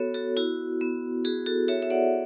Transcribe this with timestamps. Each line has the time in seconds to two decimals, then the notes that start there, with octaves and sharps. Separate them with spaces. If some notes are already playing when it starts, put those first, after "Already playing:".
Already playing: B3 F#4 A4 C#5
0.14 F#4 A4
0.37 E4 F#4
0.81 B3
1.25 F#4 G#4
1.46 F#4 A4
1.68 F#4 C#5 E5
1.82 E5
1.90 D5 F#5